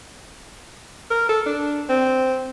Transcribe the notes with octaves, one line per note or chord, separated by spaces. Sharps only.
A#4
A4
D4
C4